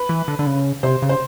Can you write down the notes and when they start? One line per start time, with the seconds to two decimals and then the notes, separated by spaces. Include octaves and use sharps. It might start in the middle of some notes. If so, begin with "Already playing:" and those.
Already playing: B4
0.09 E3
0.28 D3
0.39 D3
0.47 C#3
0.83 C3 C5
1.02 C#3
1.09 C5